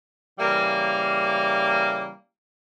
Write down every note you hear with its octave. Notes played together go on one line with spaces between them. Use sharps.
C#3 E3 G3 A#3